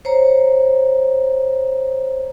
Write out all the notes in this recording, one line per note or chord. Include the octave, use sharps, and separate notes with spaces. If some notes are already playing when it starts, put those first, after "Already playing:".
C5 C#5 A#5